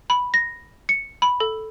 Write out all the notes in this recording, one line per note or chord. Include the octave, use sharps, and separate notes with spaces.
B5
A#6
C#7
B5
A4